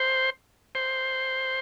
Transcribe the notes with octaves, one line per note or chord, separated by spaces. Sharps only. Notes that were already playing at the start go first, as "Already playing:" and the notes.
Already playing: C5
C5